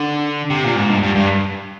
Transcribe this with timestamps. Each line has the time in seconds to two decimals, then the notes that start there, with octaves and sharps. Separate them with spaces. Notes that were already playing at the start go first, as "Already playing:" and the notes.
Already playing: D3
0.50 C3
0.64 A#2
0.76 G#2
0.89 G2
1.03 G2
1.15 G2